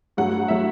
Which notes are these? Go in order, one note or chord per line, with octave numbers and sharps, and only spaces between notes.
G2 F#3 A3 F#5
F#3 A3 E5